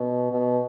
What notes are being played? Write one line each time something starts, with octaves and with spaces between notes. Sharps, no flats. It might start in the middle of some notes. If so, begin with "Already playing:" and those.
Already playing: B2
B2